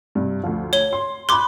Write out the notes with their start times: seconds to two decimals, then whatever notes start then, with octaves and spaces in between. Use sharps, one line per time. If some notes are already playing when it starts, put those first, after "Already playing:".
0.15 G2 C3
0.43 D2 F3
0.73 C#5 G7
0.93 C6
1.29 B5 C6 D6 F#6